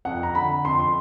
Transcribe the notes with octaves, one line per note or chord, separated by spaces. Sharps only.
F2 F#5
A#5
D3 B5
F2 C6
C6